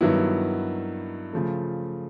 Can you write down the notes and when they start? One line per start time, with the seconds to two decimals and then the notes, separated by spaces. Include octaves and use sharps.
0.01 G2 D#3 F#3 B3 E4
1.33 C#3 F3 A3